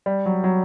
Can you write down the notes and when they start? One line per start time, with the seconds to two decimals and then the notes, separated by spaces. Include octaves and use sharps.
0.06 G3
0.26 F#3
0.44 F#3